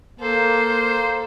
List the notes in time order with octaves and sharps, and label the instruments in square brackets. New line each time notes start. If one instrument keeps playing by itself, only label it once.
[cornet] A#3 [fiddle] A4 [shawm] C5